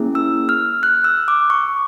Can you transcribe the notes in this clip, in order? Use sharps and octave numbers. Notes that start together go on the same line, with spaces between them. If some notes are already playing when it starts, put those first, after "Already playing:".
Already playing: A#3 C#4 E4 G#4
E6
F6
F#6
E6
D6
C#6